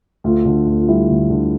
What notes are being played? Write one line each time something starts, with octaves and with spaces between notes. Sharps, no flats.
D2 F4
D3
D2
F4
G3 E4
D2
D3